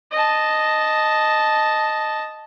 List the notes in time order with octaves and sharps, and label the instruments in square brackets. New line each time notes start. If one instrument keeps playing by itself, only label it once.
[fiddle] D#5 A5